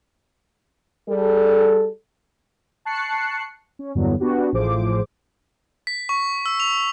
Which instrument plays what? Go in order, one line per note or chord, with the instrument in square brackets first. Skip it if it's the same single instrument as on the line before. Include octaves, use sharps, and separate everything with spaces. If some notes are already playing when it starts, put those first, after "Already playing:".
[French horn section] G3 G#4 A4
[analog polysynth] A5 C#6 F#6 C7 C#7
C#4
E2 G2 D3 F#3 B3
B3 D4 F#4 G4
A1 A2 F3 G#4 C5 D6
[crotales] B6
C#6
E6
F7